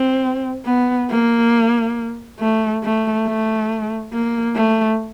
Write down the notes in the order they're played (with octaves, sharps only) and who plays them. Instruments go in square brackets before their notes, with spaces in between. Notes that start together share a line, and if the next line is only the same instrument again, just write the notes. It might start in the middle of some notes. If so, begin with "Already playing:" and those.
Already playing: [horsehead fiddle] C4
B3
A#3
A3
A3
A3
A#3
A3